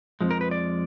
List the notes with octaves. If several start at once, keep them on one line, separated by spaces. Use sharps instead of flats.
F2 F3 G#3
A#4
B4
D5